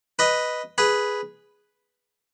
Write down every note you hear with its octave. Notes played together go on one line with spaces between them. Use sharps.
B4 D#5
G#4 B4